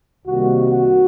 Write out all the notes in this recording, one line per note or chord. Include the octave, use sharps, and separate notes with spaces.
C2 C3 D#3 G3 A#3 F#4
F#4